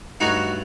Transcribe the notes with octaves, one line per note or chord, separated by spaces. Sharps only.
G2 F#3 A3 D#4 F#4